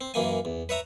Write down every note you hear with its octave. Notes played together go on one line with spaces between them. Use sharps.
C4
F#2 E3 A#3 G#5
E2
B4 C#5 E5 A#5